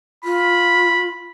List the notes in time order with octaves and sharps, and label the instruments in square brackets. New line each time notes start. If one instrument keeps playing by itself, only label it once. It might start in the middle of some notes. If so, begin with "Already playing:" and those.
[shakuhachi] F4 [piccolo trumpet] B5